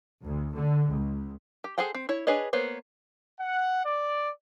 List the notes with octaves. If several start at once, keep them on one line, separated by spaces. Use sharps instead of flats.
D2
D3
C#2
G4
G#4 A4 C5 F#5 G5
C4
E4 C#5
D4 G#4 B4 C#5 D#5
A#3 B3 C5 C#5
F#5
D5